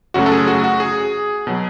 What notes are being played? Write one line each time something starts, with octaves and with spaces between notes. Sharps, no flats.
F#2 C#3 F#3 A3 C#4 F#4
A4
G#4
F#4
F#4
G#4
B2 F#3